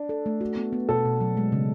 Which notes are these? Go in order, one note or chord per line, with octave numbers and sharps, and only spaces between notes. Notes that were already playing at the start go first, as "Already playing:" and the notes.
Already playing: D4
A4
A3
F#4
B3
B3
B2 A4
B2
F#3
G#3
C#3